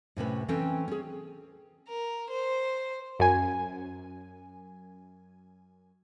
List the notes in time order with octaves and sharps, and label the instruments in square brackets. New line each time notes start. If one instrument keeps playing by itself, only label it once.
[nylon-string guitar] A2 C3 C#4 B4
E3 C4 C#4 A4 G5
C#4 G#4
[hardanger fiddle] A#4
C5
[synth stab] F#2 G#5